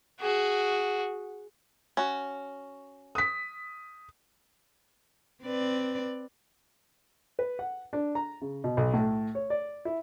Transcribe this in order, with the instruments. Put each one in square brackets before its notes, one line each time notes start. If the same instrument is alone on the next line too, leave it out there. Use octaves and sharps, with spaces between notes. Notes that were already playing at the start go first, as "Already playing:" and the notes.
[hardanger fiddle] F#4 G#4
[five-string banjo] C#4 F#4
[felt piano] D#6 B6
[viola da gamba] C4 B4 D5
[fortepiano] B4
F#5
D4
A#5
C#3
B2
B1
A2
C#5
D5
E4